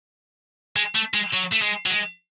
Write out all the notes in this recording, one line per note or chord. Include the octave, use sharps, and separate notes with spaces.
G#3
A3
G#3
F#3
A3
G#3
F#3
G#3